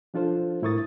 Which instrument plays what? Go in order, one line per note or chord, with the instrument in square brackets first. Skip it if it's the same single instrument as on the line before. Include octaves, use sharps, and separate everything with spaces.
[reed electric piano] F3 D4 F4 A4 C5
A2 E4 A#4 C#6 D#6 A6